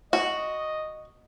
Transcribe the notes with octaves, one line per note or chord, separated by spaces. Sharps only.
F#4 D#5